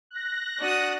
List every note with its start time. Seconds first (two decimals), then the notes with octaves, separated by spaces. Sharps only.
0.11 F#6 A#6
0.59 D4 F#4 D#6